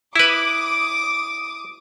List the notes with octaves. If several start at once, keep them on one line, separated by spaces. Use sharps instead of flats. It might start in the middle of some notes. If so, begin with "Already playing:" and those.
E4 B4 D6 D#6